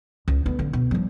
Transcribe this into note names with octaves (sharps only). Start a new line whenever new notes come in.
C#2
D3 B3
D3
B2
F3 G3